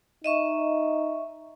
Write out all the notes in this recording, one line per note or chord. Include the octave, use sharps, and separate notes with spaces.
D#4 D#5 E5 C#6